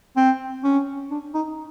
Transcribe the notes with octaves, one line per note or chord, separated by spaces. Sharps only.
C4
C#4
D4
D#4